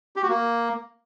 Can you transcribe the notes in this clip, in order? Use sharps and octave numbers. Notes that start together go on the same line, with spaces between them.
G4
F#4
A#3